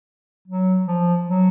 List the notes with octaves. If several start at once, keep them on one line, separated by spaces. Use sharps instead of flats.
F#3
F3
F#3